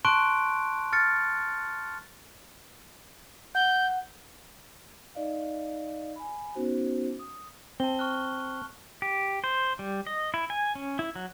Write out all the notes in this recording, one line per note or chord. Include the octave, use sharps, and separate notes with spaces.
A5 C6 C#6 F#6 D7
F6 A6 C#7
F#5 G6
D#4 D5 D#5 F5
G#5 B5
B3 C#4 D#4 F#4 C5
D#6
C4 A5 G7
C#6 F6 F#6
G4
C5
G3
D#5
E4
G#5
C#4
E4
F#3